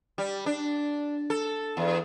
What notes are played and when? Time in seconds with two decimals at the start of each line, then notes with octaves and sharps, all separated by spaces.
0.18 G3
0.46 D4
1.30 A4
1.77 E2